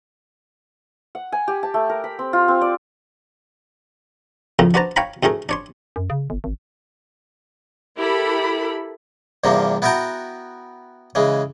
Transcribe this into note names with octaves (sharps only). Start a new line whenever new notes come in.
F#5
G#5
G4
A5
A3
A#4
B5
C4
F4
C4
D5
F2 A2 C#3 A#4
D4 F#4 B4 C5 A5 A#5
C#5 F5 G5 A#5 B5
D2 A2 A3 G#4 A#4
D4 C#5 C6
F#2
C#3
G1
G#1
E4 G4 A4 A#4 B5
E2 G2 C3 F3 A#3
B3 E4 F#4 E5 G5 A#5
C#3 E3 G#3